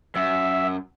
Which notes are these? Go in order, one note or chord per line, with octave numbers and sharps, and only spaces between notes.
F#2 E5